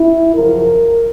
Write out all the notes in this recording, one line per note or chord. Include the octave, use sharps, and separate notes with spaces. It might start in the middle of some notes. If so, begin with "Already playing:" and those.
Already playing: E4
F#2 C#3 F3 A#4